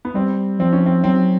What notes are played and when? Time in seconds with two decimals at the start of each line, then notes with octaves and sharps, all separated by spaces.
0.05 B3
0.14 G3 C4
0.59 F3 C4
0.73 C#4
0.86 C4
1.04 F#3 C4